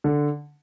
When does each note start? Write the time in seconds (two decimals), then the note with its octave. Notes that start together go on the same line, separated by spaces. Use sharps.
0.04 D3